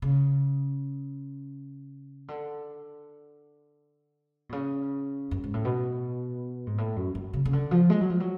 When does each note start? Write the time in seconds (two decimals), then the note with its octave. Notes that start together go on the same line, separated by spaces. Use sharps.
0.02 C#3
2.28 D3
4.49 B2
4.52 C#3
5.31 F#2
5.44 G#2
5.54 A2
5.65 B2
6.67 G#2
6.78 A2
6.96 F#2
7.15 F#2
7.33 C#3
7.45 C#3
7.53 D3
7.71 F3
7.90 G#3
8.01 F#3
8.10 F3
8.20 F#3